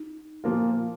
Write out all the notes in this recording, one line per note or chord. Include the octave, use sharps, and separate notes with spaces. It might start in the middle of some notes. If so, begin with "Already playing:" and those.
Already playing: D#4
A#2 F3 A#3 F4